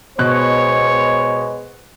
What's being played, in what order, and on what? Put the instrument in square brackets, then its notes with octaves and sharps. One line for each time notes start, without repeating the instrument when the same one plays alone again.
[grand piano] B2 F#6 [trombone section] G#3 B3 C5 [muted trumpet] C#5